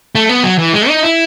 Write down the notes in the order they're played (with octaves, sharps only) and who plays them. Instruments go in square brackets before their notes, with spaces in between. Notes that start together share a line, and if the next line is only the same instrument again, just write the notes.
[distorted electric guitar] A3
B3
F#3
E3
G#3
D#4
E4